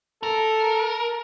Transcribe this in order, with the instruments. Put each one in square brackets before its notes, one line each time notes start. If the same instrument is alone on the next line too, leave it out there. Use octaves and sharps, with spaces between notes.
[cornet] A4 [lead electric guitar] A#4